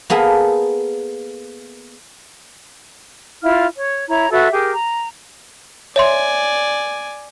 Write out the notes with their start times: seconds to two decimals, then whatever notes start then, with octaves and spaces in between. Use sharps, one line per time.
0.10 A#3 B3 G#4 A4 F5
3.43 E4 F4 F5 F6
3.76 C#5
4.08 E4 C#5 A#5
4.31 F#4 A4 B4 E5
4.52 G4 G#4 A#4
4.73 A#5
5.96 C#5 D5 E5 G#5 C6